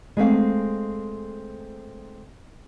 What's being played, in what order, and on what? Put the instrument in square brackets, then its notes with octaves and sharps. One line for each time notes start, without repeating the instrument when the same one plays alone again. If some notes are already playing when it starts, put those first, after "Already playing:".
[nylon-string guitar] G#3 A3 C4 F5